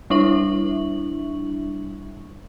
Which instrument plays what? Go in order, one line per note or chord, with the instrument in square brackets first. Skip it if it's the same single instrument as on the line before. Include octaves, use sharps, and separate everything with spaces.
[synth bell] G3 D4 E4 E5 C#6 F#7